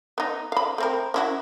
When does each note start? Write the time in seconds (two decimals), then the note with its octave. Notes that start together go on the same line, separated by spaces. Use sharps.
0.18 B3 D#4
0.52 F5 B5
0.78 A3 C4 A#4
1.14 C#4 E4 F#4